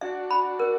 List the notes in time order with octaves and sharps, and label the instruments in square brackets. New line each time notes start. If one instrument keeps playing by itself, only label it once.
[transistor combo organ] D4 F#4 [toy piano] E5
[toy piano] B5
A#4